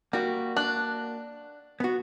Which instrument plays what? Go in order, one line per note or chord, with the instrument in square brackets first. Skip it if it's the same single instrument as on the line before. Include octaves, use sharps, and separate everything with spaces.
[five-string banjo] G3 [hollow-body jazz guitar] A#3 F#4
[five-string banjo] D4 [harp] F#6
[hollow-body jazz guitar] B3 F#4